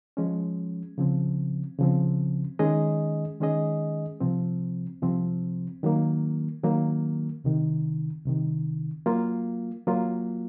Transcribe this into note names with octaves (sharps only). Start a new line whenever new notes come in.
F3 G#3 C#4
C#3 F3 C4
C#3 F3 C4
D#3 G#3 C#4 G#4 D#5
D#3 G#3 C#4 G#4 D#5
C2 C3 F3 C4
C2 C3 F3 C4
D#3 F#3 A#3
D#3 F#3 A#3
C2 C3 D#3
C2 C3 D#3
F#3 A#3 F4
F#3 A#3 F4